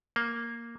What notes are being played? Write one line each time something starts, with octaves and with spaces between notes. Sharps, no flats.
A#3